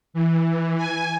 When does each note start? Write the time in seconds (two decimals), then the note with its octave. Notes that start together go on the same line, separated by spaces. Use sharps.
0.14 E3
0.77 G#5